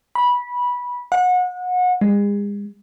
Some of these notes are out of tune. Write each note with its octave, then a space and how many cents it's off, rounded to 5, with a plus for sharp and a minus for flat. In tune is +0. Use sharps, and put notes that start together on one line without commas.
B5 -15
F#5 -30
G#3 -40